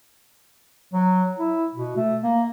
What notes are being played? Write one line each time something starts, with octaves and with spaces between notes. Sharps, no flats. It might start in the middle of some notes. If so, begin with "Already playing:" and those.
F#3
E4
B2
A3
A#3